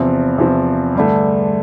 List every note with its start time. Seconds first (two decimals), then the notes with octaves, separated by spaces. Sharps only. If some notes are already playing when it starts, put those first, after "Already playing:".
Already playing: E2 C3 F3
0.38 E2 C3 F3
0.95 G2 D3 A3